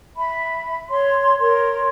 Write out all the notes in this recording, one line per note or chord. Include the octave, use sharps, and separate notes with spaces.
E5 B5
C#5 C6
A#4 C#5 C6